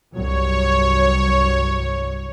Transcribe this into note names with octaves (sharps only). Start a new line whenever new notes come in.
C2 G2 F#3 C#5